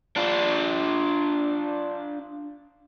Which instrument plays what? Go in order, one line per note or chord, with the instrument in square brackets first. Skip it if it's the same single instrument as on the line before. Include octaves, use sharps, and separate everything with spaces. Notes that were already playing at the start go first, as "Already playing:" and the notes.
[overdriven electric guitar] D4 F4